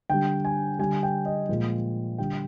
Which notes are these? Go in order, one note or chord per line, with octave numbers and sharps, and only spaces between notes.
D3 G3 G5
G#5
D3 G3 G#5
G5
D#5
A#2 F3 G#3
D3 G3 G5